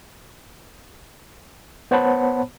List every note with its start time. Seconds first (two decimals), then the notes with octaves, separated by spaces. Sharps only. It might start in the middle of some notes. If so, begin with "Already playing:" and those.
1.91 B3 C5 C#5 F#5 A5 B5